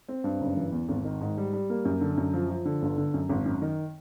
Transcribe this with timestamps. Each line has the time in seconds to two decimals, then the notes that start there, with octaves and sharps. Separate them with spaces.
0.09 C4
0.24 G2
0.41 F#1
0.57 E3
0.72 E2
0.89 G#1
1.04 D#3
1.21 G#2
1.37 G3
1.53 G3
1.70 A#3
1.85 F#2
2.01 D3
2.17 F#2
2.33 F3
2.49 F3
2.65 D3
2.82 G1
2.98 D3
3.14 F#2
3.29 G#1
3.46 F#2
3.62 D#3